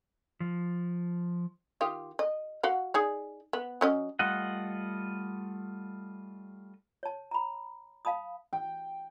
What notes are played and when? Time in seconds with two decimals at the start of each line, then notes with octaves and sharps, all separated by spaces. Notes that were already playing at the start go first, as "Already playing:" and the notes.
0.40 F3
1.81 D#3 F4 G4
2.19 D#5
2.63 F#4 F5 F#5
2.94 D#4 G#4 D5
3.53 B3
3.81 F#3 C#4 D#5
4.19 G3 A3 F4 D#5 F#5
7.03 C#5 A5
7.31 A#5 B5
8.05 F5 A5 B5 D#6
8.53 G5